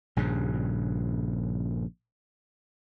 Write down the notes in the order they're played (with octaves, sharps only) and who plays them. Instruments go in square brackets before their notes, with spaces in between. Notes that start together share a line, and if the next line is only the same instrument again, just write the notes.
[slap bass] A#1 G2 C#3